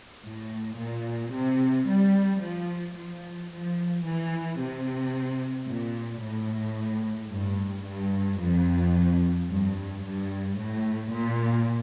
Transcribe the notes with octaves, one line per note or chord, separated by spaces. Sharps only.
A2
A#2
C3
G3
F3
F3
F3
E3
C3
A#2
A2
G2
G2
F2
G2
G2
A2
A#2